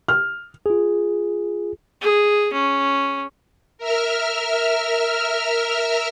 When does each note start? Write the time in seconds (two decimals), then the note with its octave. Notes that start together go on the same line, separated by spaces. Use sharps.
0.08 F6
0.66 F4 G#4
2.01 G#4
2.53 C#4
3.78 A#4 E5 F6